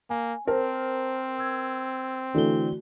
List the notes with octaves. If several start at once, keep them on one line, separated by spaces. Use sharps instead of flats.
A#3 G#5
C4 A#4 C5 A5
E6 G#6
D3 E3 A3 F#4 G7